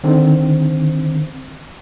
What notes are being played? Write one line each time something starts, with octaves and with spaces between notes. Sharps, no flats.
D3 D#3 C4